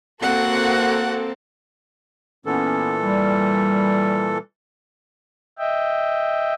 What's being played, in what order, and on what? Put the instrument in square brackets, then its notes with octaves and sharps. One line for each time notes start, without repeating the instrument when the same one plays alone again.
[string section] A#3 C4 A4 [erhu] F#4 [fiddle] F#5
[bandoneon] A#2 E3 A4 [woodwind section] B3 C#4
[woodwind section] G3
[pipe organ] D#5 E5 G5